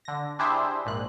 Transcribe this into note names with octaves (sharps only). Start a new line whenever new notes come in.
D3 A#6
D4 E4 G4 G#4 C5 E5
A#1 G#2 F#6